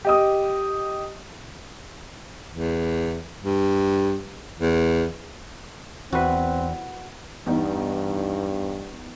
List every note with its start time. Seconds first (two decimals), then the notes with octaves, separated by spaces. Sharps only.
0.05 G4 D#5 D#6
2.51 E2
3.43 G2
4.60 E2
6.13 E2 C4 F#4 B4
7.46 E2 G2 D#4